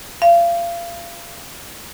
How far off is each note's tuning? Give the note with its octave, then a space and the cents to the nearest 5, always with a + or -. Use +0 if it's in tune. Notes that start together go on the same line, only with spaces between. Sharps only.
F5 -30